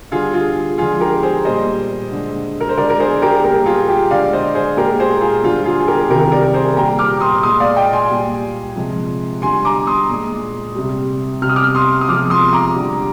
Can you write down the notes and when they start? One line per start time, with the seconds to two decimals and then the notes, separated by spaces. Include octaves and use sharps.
0.11 D3 G3 F4 G#4
0.33 F4 G#4
0.78 D3 F3 G#3 F4 G#4
1.00 G4 A#4
1.23 G#4 C5
1.45 A#2 G3 C5 D#5
2.12 D3 G#3
2.61 A#4
2.69 C5
2.77 D3 G#3 A#4 D5
2.90 A#4
3.00 G#4 C5
3.22 G4 A#4
3.44 A#2 G3 G4 A#4
3.66 F4 G#4
3.88 G4
4.11 D3 G#3 D5 F5
4.33 C5 D#5
4.55 G#4 C5
4.77 A#2 G#3 G4 A#4
4.99 G#4 C5
5.21 F4 G#4
5.43 D3 G3 F4
5.65 F4 G#4
5.80 G#4
5.87 G4 A#4
6.10 C3 D#3 G3 G4 A#4
6.32 A#4 D5
6.54 G#4 C5
6.77 A#2 G3 G5 A#5
6.99 D6 F6
7.20 C6 D#6
7.43 A#2 G#3 C6 D#6
7.60 D5 F5
7.76 D#5 G5
7.93 G#5 C6
8.10 A#2 G3
8.76 C3 F3 G#3
9.42 D3 G3 G#5 C6
9.65 A#5 D6
9.87 C6 D#6
10.09 A#2 G#3
10.75 C3 G3
11.42 C3 G3 F6
11.49 D#6
11.56 D6 F6
11.75 C6 D#6
12.01 D#6
12.09 C3 F3 G#3 D6 F6
12.30 C6 D#6
12.53 A#5 D6
12.75 D3 G3